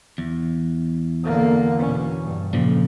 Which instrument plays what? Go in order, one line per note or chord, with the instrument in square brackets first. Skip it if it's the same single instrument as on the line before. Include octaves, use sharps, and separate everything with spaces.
[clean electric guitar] E2
[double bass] D3 A#3
B2 C#4
G2
[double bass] F2 [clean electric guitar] A#2 C#3 F3